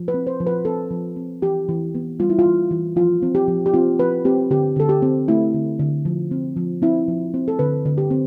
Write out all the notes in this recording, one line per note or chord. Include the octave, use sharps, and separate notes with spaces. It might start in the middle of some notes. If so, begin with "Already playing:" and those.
Already playing: F3
B4
C4
C5
F3
B4
C4 A4
F3
C4
E3 G4
E3
B3
G3 F4
E4
F4
E3
E3
F3 F4
C4
G4
F3
G4
C4 F4
F3 B4
C4 G4
D3 G4
D3 A4
G4
C4
A3 E4
D3
D3
F3
C4
F3
C4 E4
F3
C4
A4
D3 B4
D3
G4
C4